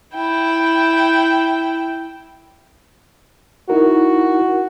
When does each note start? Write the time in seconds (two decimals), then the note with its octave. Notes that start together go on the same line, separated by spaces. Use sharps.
0.14 E4 G5
3.70 D#4 E4 F#4 A#4